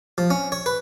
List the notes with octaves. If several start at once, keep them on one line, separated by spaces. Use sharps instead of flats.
F3
C#4
C#5
B4